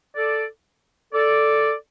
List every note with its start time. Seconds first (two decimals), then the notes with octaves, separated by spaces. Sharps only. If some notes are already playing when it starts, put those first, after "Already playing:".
0.14 A4 D5
1.13 A4 D5